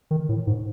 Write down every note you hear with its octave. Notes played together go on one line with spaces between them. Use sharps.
D#3
A2
G#2